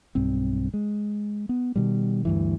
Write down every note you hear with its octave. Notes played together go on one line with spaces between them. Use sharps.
B1 G2 C4
G#3
B3
B2 D#3 G3
D2 G2 E3